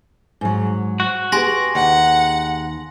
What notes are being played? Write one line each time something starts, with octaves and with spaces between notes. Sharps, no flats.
G#2 F#3
F#4
G4 G#4 B4 G#5 C6 A#6
D#2 F#5